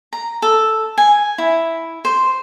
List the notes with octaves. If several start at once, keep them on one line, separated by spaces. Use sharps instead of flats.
A#5
A4
G#5
E4
C5